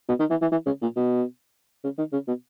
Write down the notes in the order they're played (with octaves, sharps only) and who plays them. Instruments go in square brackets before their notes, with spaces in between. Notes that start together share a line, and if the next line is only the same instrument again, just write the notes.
[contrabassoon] B2
D#3
E3
E3
E3
C#3
A#2
B2
C#3
D#3
C#3
B2